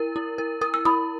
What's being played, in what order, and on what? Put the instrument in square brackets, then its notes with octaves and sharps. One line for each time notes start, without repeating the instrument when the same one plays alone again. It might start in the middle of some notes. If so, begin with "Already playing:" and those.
Already playing: [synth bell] E4 A#4
E4
A#4
[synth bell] A#4 [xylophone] D#6
[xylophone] E6
[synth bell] E4 [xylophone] B5 D#6